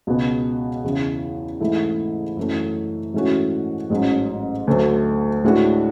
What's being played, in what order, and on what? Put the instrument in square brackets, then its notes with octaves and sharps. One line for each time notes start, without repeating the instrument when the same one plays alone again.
[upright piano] C#2 B2 G#3 B3 F#4
E2 C#3 E3
G#2 E3 A3 E4
F#2 E3 A3
G#2 E3 A3 C#4 F#4
A1 G#2 F#3 C#4
D2 D3 F#3 A3
A2 G#3 D4 F#4